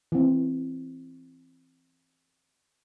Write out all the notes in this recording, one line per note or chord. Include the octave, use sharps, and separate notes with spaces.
E3 C4